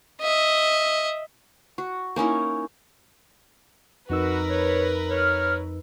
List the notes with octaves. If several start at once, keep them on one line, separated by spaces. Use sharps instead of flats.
D#5 E5
F#4
A#3 C#4 D#4 E4
F2 D#4 F#4 A#4 B4 E6
C#5
C#5 F6